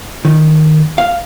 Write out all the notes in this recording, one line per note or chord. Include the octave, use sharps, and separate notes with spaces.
D#3
F5